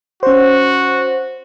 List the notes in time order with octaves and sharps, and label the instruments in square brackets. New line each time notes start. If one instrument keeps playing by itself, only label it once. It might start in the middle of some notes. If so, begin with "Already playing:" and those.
[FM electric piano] C#4 C5 [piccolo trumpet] F#4